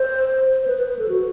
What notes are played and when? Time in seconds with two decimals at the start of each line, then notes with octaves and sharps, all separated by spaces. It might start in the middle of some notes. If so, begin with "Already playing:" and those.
Already playing: C5
0.63 C5
0.67 B4
0.78 B4
0.88 B4
0.99 A4
1.09 F#4